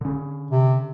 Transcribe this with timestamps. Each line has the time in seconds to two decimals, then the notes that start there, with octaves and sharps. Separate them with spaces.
0.01 D3 C#4
0.50 C3